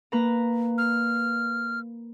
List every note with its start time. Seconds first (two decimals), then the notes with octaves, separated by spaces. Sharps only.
0.12 A#3 B4 A#5
0.78 F6